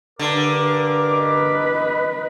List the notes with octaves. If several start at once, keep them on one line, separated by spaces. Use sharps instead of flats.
G2 D3 A#4 D6
B4 D#5